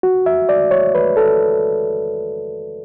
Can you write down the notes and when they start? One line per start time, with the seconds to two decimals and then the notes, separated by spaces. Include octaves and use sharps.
0.03 F#4
0.26 E5
0.49 D5
0.71 C#5
0.95 B4
1.17 A4